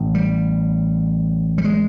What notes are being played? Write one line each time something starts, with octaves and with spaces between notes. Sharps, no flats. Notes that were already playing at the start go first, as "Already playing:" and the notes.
Already playing: A1 A2
G3
G3
G#3